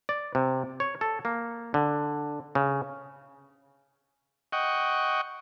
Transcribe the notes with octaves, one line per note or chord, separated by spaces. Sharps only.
D5
C3
C#5
A4
A#3
D3
C#3
D#5 F#5 G5 C#6